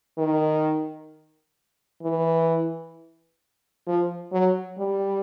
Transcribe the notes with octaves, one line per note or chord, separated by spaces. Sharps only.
D#3
E3
F3
F#3
G3